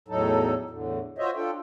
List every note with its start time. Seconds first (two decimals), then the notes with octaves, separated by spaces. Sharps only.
0.08 E2 A2 F#3 D#4 A4
0.70 E2 A2 D3
1.18 F4 F#4 C5 C#5 D#5 E5
1.36 D4 F4 A4 G5